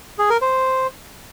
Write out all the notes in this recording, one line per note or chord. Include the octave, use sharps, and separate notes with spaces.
G#4
A#4
C5